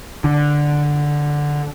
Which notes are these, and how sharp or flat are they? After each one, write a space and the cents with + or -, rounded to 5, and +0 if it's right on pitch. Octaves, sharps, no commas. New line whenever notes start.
D3 +0